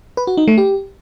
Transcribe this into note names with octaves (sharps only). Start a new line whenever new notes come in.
B4
F#4
D#4
A3
G4